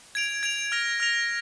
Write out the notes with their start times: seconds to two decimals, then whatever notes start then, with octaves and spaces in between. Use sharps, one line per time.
0.15 G#6 D7 F7
0.43 G#6 D7 F7
0.72 F6 A#6 F7
1.00 F6 A#6 F7